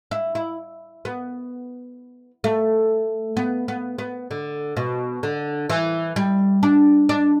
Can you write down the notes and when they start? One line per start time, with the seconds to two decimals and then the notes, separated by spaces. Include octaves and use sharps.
0.11 E4
0.35 E4
1.05 B3
2.44 A3
3.37 B3
3.68 B3
3.98 B3
4.31 D3
4.77 B2
5.23 D3
5.70 E3
6.16 G3
6.63 D4
7.09 D4